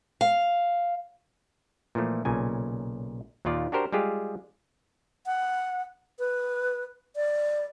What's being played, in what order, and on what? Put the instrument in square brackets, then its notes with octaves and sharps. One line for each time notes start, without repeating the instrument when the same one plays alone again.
[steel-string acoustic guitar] F5
[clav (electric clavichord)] A#2 E3 F3 A3
B1 A#2 C#3 G#5
D#2 A#2 D#3 F4 D5
D4 F#4 G4 A#4 C5
G3 G#3 F4 G4 G#4
[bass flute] F#5
B4
D5